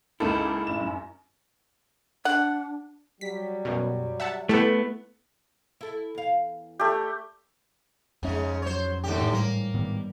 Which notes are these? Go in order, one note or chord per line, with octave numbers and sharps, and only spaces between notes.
C#2 A#3 D#4 E4 A4
A1 E7
F#2
D4 F#5
F#3 G3 B6
F#2 B2
E5 F#5 A5
A3 B3 E4 G4 A4
E4 A4
E2 F5
A3 G4
F2 G#2 C#3 G#3 C#4
F#3 C5 C#5
A1 D#2 G#2 D3 G4
G3 A#3
G#2 D#3 G3 B3